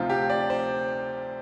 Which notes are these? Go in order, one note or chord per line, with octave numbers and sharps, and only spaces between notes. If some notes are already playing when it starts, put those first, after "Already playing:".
Already playing: D2 C3 F3 C4 D#4 F4
G4
D5
C5